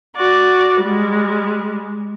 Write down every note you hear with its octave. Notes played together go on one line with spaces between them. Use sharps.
F#4 D5
G3 G#3